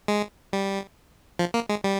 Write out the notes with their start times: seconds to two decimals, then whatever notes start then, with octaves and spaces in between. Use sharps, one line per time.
0.08 G#3
0.53 G3
1.39 F3
1.54 A#3
1.69 G#3
1.84 G3